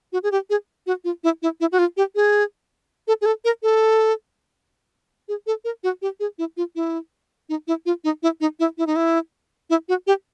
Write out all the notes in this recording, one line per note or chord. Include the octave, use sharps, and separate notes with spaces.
F#4
G#4
G4
G#4
F#4
F4
E4
E4
E4
F#4
F4
G4
G#4
A4
G#4
A4
A#4
A4
G#4
A4
A#4
F#4
G4
G#4
E4
F4
E4
D#4
E4
F4
D#4
E4
D#4
E4
E4
D#4
E4
E4
F#4
G4